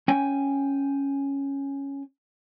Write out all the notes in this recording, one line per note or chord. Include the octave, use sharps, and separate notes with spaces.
C#4 G5 G#5